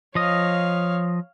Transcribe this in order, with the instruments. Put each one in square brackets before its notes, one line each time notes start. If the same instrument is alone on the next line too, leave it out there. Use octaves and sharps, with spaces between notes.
[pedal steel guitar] F3 D#5 [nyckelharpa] C#5 F5